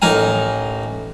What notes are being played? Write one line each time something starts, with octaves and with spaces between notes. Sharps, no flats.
A1 D#4 A#4 G#5